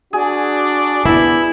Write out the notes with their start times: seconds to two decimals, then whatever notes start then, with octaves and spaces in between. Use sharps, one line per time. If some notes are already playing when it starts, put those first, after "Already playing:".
0.13 D4 F#4 G#4
1.06 B3 E4